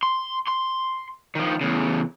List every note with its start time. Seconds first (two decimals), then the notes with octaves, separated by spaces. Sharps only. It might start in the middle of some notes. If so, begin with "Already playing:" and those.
0.03 C6
0.47 C6
1.35 D#3 F3
1.61 E2 C#3